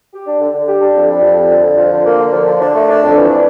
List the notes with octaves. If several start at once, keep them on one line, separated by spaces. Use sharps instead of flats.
G4
D4
D3
D3
G4
D4
F2
G3
F2
G3
D3
F2
F3
D3
A#3
D3
F3
D3
D4
A3
D4
F2
E3
D4